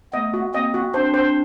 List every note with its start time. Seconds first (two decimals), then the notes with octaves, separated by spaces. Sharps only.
0.13 A3 B3 D#5
0.34 F#4
0.54 A#3 C4 D#5
0.74 F#4
0.94 C4 D4 C5
1.14 C5